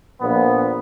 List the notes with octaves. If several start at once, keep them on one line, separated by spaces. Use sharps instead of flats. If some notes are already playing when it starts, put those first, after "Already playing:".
A#1 A#2 B3